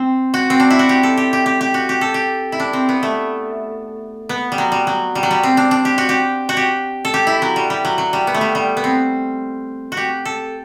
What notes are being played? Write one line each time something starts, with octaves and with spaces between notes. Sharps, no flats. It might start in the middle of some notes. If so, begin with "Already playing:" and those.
Already playing: C4
F#4
C4
D4
E4
F#4
G4
A4
G4
G4
G4
G4
F#4
G4
A4
G4
E4
D4
C4
B3
A3
B3
G3
F#3
G3
F#3
G3
F#3
G3
C4
D4
D4
G4
F#4
G4
F#4
G4
A4
G4
E4
F#3
G3
G3
F#3
F#3
G3
B3
A3
G3
G3
B3
C4
F#4
G4
A4